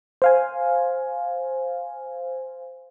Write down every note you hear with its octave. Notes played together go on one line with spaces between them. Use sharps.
C5 F5 G#5